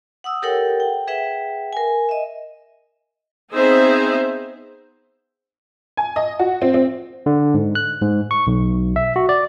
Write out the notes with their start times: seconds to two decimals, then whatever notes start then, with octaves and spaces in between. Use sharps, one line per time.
0.24 F#5 D#6 E6
0.42 G4 A4 A#4 C#5 F#5 G5
0.80 G5
1.07 G#4 B4 E5 F#5 G5
1.73 A#4 G#5
2.09 D#5 E5
3.54 B3 C4 D#4 G#4 C5 E5
5.97 G#5
6.16 D#5
6.39 F#4
6.62 C4
6.74 C4
7.26 D3
7.54 G#2
7.75 F#6
8.02 G#2
8.31 C#6
8.47 B1
8.96 E5
9.16 F#4
9.29 D5